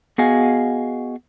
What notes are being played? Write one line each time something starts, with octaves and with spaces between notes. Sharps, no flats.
B3 F#4 G#4 D#5 F5 G#5